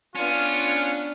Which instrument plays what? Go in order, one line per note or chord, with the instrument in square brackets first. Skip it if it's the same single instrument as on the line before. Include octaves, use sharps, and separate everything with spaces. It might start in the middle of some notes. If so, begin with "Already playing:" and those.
[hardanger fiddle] B3 D4 [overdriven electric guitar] C#4 [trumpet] F4